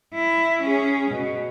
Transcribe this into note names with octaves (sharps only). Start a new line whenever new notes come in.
E4
C#4 G#4
B2